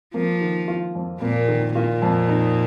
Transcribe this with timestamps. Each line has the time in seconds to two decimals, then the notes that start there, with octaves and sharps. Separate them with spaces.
0.14 F3 A#3
0.41 D#3
0.68 F4
0.95 F2
1.21 A#2 A#3
1.48 D#3
1.75 A#2 F4
2.02 F2
2.29 D#4